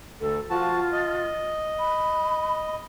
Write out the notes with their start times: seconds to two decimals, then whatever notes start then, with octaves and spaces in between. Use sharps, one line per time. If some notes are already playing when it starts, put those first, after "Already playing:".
0.20 D2 A4
0.50 F3 F4 F#4 A5
0.92 D#5
1.79 B5